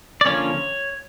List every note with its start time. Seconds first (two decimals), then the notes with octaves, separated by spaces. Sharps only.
0.21 D5
0.26 D3 F3 A#3 C#4 C#5